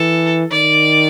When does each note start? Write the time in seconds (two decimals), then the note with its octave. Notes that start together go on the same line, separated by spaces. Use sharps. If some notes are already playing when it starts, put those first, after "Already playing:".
Already playing: E3 A4
0.52 D#3 D5